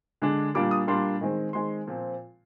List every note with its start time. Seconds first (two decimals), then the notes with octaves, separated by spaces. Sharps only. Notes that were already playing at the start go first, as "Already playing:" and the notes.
0.22 D3 G#3 D4
0.54 A#2 G3 A#3 D4 D6
0.71 D#6
0.87 A#2 G3 A#3 D4 C6
1.21 D#3 G#3 C4
1.53 D#3 G#3 C4 C6
1.87 A#2 F3 C4